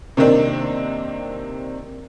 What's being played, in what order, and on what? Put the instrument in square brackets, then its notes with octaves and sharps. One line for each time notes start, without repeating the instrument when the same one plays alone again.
[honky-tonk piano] C3 D#3 A#3 C4 D4